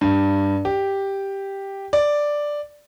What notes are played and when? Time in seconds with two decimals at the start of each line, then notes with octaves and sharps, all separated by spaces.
0.01 G2
0.65 G4
1.93 D5